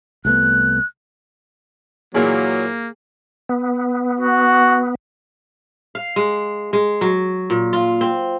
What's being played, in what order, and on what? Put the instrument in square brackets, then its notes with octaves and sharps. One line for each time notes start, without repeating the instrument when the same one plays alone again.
[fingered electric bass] C2 A3 B3 [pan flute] F#6
[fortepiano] A#2 E3 [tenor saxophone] F#3 [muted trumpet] A#3 [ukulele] G#4
[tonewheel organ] B3
[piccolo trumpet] F#4
[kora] F5
G#3
G#3
F#3
A#2
F4
C4